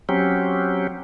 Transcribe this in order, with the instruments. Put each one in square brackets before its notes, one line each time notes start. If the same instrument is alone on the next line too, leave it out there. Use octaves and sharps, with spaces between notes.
[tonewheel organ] F#3 C4 C#4 G4